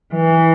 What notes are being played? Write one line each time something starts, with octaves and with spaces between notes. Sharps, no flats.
E3